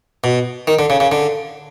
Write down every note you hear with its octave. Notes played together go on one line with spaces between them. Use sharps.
B2
D#3
D3
C#3
C#3
D3